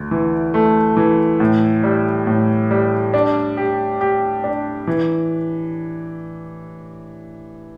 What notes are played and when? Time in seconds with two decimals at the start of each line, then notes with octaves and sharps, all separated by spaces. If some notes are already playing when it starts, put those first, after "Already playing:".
Already playing: D2
0.11 E3
0.54 A3
0.97 E3
1.40 A2
1.84 G3
2.27 A2
2.71 G3
3.14 D4
3.57 G4
4.01 G4
4.44 D4
4.87 E3